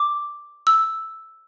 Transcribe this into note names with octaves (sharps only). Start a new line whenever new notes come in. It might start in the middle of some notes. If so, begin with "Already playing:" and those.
Already playing: D6
E6